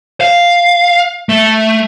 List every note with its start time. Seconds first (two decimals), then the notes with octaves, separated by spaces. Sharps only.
0.21 F5
1.29 A3